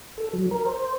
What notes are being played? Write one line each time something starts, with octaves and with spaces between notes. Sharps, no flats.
A4
F#3
A#4
C5